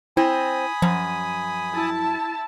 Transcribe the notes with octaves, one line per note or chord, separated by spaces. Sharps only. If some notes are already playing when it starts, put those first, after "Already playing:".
C4 E4 G#5 B5 D#6
F#2 F3
E4 A5